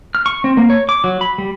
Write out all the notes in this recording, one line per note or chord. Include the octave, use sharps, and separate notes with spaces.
F6
C#6
C4
A#3
C#5
D6
F#3
B5
G3